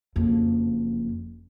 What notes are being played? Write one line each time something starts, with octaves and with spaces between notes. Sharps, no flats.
F#1 F2